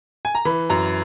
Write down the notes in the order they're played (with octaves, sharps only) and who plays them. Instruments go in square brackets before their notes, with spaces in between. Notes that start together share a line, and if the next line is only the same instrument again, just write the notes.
[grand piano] G#5
A#5
E3 B5
F#2 A#5